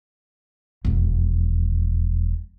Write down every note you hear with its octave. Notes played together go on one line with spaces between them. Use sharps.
E1 F2